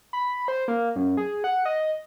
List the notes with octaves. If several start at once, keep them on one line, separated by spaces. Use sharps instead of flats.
B5
C5
A#3
F#2
G#4
F#5
D#5